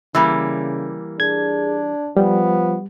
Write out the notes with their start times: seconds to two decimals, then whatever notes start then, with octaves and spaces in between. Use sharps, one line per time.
0.15 C#3 E3 G3 A#3
1.20 D4 G#4 G#6
2.17 F3 G3 B3